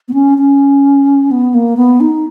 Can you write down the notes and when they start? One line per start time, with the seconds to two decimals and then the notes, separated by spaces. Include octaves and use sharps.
0.08 B3
0.13 C#4
0.38 C#4
1.31 B3
1.54 A#3
1.77 B3
2.00 D#4